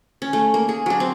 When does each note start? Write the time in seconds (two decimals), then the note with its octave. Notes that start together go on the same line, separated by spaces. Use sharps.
0.22 C#4
0.33 A3
0.54 A#3
0.69 G#4
0.86 F#3 D4
1.00 C4